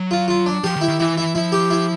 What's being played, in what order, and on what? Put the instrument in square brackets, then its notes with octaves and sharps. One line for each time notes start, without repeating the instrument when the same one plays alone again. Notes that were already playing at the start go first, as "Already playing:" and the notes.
Already playing: [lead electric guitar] F#3
[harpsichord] F4
F4
D4
[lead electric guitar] F3 [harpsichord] G4
[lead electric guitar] D#3
[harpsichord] E4
[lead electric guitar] D#3
[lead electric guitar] E3 [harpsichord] E4
[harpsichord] E4
[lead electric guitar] F3 [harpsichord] E4
[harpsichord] G4
E4